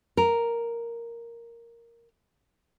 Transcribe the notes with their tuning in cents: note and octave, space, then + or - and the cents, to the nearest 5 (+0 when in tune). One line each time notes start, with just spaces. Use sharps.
A#4 +0